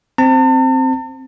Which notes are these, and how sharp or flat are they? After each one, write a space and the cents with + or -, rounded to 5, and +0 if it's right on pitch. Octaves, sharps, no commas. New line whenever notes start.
C4 +0 A5 +40